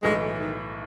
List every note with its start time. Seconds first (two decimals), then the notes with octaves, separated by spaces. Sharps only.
0.03 B1 A2 E3 G#3
0.39 D#3